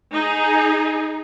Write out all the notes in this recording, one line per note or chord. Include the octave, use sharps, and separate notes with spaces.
D#4 G#4